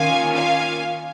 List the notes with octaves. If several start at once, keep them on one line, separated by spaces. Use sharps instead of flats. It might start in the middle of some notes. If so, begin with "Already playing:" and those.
Already playing: D#3 A#3 C#4 F4 F5 G#5
F5 G#5